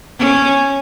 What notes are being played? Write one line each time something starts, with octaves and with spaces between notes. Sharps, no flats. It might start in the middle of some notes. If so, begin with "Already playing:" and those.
C#4